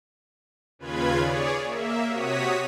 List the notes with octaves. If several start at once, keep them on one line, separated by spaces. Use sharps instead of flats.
D#2 C#3 F4 B4 B5 G#6
G#4 C#5 D5
A#3 E5
C3 F#4 C#5 D#6 B6